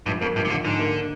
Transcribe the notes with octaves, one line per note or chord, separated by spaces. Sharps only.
A#1 G2
F2 A#3
A#1 G2
C3
A#1 D3
G#2 D3
A#3